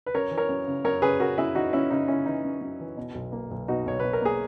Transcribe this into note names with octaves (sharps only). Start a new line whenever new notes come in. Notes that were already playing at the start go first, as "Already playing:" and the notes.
B4
F#2 A#4 C#5
E3
A#4 C#5
F#2
C#3
F#2 A#4 C#5
C#3 G#4 B4
C#3 F#4 A#4
F#2 E4 G#4
E3 D#4 F#4
C#3 C#4 E4
C#3 D#4
C#3 C#4 E4
E3 D#4
F#2
F#2
E3
B2
B1
A#3
B1
B2 D#4 F#4
B1 C#5
B2 B4
A#4
A#3 G#4